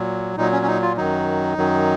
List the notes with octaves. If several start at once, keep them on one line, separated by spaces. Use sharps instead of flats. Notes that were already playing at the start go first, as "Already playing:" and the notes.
Already playing: A#2 F#3
A#2 F#3 D#4
C#4
C#4
D#4
F4
F#2 D#3 F#3 D#4
F#2 D#3 F#3